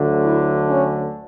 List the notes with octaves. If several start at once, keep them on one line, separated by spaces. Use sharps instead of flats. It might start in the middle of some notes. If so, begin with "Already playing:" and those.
Already playing: D2 D3 F#3 A3
E4
C#4